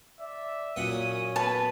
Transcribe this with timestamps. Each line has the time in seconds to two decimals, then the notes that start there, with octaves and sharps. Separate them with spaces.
0.18 D5 E5
0.76 F#2 A#2 C#4 F#5 D#6
1.36 B3 B4 A5